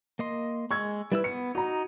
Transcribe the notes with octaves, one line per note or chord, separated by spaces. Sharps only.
A#3 D#5 C6
G#3 C#6 E6 G#6
G3 E4 B4 E6
B3 C#7
D#4 F#4 A#5